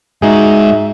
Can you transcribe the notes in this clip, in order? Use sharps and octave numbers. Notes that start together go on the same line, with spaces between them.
G#2 G#3 D#4 F#4 G#4 E5